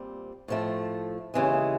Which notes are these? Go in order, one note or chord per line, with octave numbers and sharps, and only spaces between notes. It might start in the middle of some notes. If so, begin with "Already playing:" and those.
Already playing: A#2 G3 C4
A2 F3 A3
D#2 C#3 E3 G#3